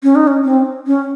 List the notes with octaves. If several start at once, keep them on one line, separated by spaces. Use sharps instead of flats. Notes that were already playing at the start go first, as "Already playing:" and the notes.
C#4
D#4
C#4
C4
C#4